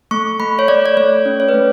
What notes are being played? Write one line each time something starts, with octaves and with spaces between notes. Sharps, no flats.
A3 C#6
A3 B5
C#5
A3 D5
D5
A3 C#5
C#4
C#5
B4
A3